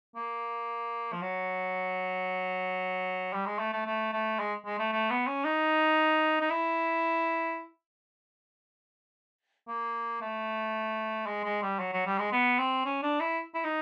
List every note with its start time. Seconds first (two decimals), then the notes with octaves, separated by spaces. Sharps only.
0.16 A#3
1.12 F3
1.22 F#3
3.33 G3
3.46 G#3
3.59 A3
3.73 A3
3.86 A3
4.13 A3
4.39 G#3
4.66 G#3
4.79 A3
4.92 A3
5.10 B3
5.27 C#4
5.45 D#4
6.41 D#4
6.50 E4
9.68 A#3
10.21 A3
11.26 G#3
11.44 G#3
11.62 G3
11.79 F#3
11.93 F#3
12.06 G3
12.19 G#3
12.33 B3
12.59 C4
12.85 C#4
13.03 D4
13.20 E4
13.55 E4
13.65 D#4